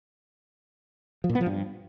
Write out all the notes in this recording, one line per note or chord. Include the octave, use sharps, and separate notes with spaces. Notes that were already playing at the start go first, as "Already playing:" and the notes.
F3
A#2
B3
F3
G2